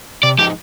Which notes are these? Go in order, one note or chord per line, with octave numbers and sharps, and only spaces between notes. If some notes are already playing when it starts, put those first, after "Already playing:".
C3 D5
F3 G#3 D#4 G4